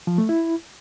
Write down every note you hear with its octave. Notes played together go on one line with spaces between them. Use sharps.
F3
A3
E4